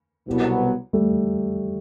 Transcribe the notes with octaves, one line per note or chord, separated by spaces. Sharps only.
C2 B2 F#3 B3
G3 A3